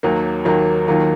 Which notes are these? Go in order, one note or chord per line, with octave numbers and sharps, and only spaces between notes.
D#2 D#3 F#3 A#3
D#2 D#3 F#3 A#3
D#2 D#3 F#3 A#3 F4